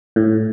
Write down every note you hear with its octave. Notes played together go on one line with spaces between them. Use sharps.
A2